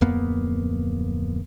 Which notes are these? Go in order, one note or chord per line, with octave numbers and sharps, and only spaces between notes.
D1 F2 A#3 B3